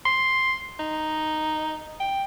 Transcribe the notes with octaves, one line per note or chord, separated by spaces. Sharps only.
C6
D#4
G5